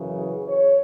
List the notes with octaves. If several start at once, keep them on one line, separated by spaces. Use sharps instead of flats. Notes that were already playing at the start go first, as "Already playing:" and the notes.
Already playing: F#2 C#3 E3
G#4
C#5